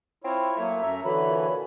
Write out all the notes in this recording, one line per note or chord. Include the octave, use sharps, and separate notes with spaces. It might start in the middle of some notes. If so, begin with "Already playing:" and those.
C4 E4 F4 C#5
F#3 A3 A#3 C#5
F#2 E5 A#5
D3 E3 F#4 C#5 B5
A#2